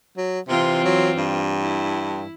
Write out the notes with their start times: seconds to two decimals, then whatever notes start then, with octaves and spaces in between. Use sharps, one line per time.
0.17 F#3
0.49 C3 E3 C4 F4
0.85 F#3
1.16 G2
1.61 E4